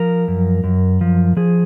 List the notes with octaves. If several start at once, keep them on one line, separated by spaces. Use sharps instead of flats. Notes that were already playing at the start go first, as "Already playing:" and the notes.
Already playing: F3 A#4
F#2
F#2
F3
F3 G#4